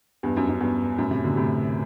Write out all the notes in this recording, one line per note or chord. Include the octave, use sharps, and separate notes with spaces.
E2 G2
F#2
F#2
E2 G2
F#2 A2
A2 C3
B2 D3
A2 C3